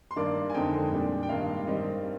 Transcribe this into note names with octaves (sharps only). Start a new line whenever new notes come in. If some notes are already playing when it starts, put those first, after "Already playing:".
C6
G2 D#3 A#3 D4 D6
G#5
F2 D3 G#3 C4 D#4 G5
A#2 G3 D4
G5
G2 D#3 G#3 F5
G2 D#3 G3 C4 D#5